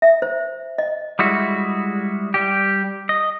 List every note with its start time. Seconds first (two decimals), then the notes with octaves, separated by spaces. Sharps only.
0.02 E5
0.22 C5
0.78 D#5
1.19 G3 G#3 E4 F#4
2.34 G3 G4
3.09 D#5